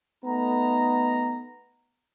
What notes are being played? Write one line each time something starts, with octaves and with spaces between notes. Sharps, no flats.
A3 B3 D#4 A#5